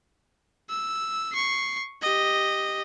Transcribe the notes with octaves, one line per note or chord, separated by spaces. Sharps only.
E6
C#6 C7
G4 D#5